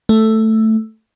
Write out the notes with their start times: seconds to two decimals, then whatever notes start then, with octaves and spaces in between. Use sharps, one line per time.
0.09 A3